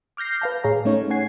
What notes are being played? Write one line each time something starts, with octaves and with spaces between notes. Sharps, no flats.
D6 F6 G6 A#6 C7
B4 F5 A5
A2 G#4 C#5 F5 A#5
A3 C#4 D#4 C#5
C#5 F#5 G#5 G#6 C7